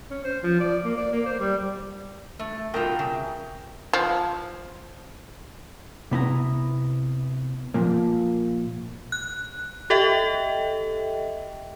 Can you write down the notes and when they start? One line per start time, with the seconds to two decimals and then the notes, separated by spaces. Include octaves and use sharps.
0.10 C#4
0.24 C5
0.43 F3
0.60 D5
0.84 A#3
0.97 D5
1.12 A#3
1.25 C5
1.40 G3
2.39 A3
2.74 B2 G3 F4 A#4 E5 G5
2.99 C#3
3.93 F3
6.11 C3 B3 E4 A#5
7.74 A#2 F3 A#3
9.12 F#6
9.90 G4 A4 D#5 E5 G5